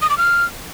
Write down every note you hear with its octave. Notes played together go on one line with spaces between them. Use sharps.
D#6
D6
F6